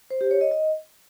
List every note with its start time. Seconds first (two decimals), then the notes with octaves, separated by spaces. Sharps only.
0.11 C5
0.21 G4
0.31 C#5
0.41 D#5
0.51 D#5